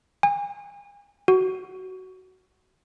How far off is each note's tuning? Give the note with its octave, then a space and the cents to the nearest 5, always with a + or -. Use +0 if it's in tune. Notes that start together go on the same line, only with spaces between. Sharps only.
G#5 -40
F#4 +15